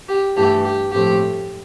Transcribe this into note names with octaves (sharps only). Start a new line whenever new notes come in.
G4
G2 E3 A3 G4
G4
A2 F3 A3 C4 G4